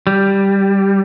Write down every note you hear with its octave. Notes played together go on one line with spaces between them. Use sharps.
G3